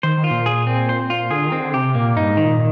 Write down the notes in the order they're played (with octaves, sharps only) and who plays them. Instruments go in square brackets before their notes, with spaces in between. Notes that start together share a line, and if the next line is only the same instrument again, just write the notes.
[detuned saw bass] D#3 [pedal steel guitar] C5
[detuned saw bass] D#3
[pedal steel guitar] F4
[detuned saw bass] A#2
[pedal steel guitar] G#4
C4
C5
F4
[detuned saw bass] D3 [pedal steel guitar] G#4
[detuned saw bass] D#3
[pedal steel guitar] C4
[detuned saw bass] D3
[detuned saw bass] C3 [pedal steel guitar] G4
[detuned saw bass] A#2 [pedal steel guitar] A#3
[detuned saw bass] G2 [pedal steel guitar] D#4
[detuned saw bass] G#2
[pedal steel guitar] D#3
[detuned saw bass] A#2